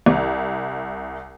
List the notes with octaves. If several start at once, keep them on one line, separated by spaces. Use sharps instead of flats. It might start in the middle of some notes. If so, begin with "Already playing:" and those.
C2